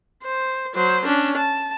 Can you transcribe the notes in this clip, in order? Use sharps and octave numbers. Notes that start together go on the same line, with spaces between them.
C5
F#3 C5
C#4 D4
A5